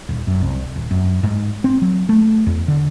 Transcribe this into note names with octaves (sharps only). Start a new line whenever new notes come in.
D#1
F#2
C2
D#1
F#2
G#2
C4
F#3
A3
E2
D3